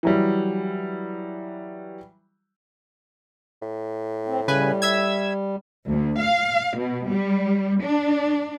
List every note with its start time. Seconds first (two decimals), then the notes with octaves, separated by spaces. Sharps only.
0.03 E3 F#3 G3
3.62 A2
4.26 C4
4.48 C#3 G3 B4 G#5
4.82 E5 E6 G#6
5.87 D2
6.20 F5
6.79 B2
7.08 G3
7.82 D4